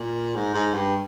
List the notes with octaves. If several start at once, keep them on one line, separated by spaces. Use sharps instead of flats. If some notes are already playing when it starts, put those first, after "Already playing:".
Already playing: A#2
G#2
G#2
G2